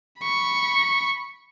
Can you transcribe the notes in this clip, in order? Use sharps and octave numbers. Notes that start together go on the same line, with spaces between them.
B5 C#6